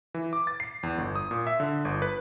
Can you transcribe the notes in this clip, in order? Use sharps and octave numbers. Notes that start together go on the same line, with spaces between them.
E3
D6
A6
C7
E2
G1
D#6
A#2
E5
D3
G1
B4